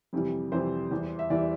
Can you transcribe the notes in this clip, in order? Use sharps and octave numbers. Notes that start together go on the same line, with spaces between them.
F2 C3 E3 G3
F2 C3 E3 G3 C5
E2 E3 G3
E5
E2 E3 G3 D5